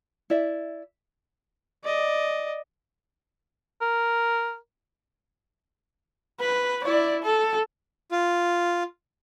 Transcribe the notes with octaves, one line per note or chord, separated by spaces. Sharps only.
E4 D5 E5
D5 D#5
A#4
B4
E4 D5
A4
F4